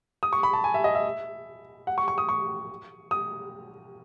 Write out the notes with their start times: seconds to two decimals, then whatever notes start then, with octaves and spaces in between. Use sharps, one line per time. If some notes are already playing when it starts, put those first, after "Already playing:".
0.23 D#6
0.33 C#6
0.43 B5
0.53 A5
0.64 G#5
0.74 E5
0.84 D#5
0.95 E5
1.87 F#5
1.98 C#6
2.08 C#6
2.18 D#6
2.29 C#6
3.11 D#6